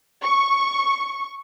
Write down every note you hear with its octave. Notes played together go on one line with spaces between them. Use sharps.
C#6